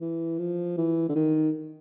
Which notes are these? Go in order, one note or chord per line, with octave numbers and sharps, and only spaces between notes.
E3
F3
E3
D3
D#3